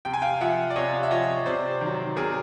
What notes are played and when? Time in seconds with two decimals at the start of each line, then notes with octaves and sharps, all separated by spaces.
0.05 C3 G5
0.13 G#5
0.22 F5 G5
0.41 F3 E5 F#5
0.70 D5
0.76 C3 C#5 D#5
1.03 E5
1.11 F3 C#5 D#5
1.46 C3 C5 D5
1.81 D#3 F#3
2.16 C3 G#4 A#4